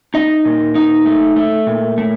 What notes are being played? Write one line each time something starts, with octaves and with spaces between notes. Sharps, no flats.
D#4 D#5
A#2
D#4
A3
A3
A#2
A3